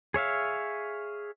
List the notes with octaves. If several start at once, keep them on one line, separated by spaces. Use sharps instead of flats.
G#4 C#5 E5 F5